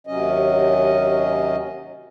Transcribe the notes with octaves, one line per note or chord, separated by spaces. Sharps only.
D#2 C3 F#3 C#4 D#5